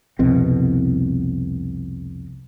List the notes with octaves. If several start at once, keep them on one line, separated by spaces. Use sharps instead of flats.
C2 F2 B2 C4